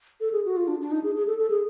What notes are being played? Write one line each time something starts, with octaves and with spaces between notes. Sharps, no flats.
A4
G#4
F#4
F4
D4
D4
D#4
G#4
G#4
A4
A4
G#4